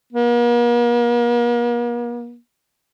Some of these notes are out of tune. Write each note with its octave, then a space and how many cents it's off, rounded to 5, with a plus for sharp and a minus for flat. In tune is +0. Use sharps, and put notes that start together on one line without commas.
A#3 +45